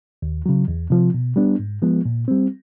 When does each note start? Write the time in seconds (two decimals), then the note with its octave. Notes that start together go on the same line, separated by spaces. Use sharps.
0.22 D#2
0.46 C#3 F#3
0.68 E2
0.90 C3 F3
1.14 B2
1.36 G3 B3 D4
1.59 G#2
1.82 F3 G#3 B3
2.05 A#2
2.28 G3 C4